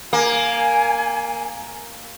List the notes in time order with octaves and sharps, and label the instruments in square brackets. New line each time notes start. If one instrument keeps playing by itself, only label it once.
[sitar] A#3 [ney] G#5